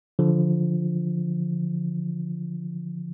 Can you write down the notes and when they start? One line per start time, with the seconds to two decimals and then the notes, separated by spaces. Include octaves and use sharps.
0.19 D3 F3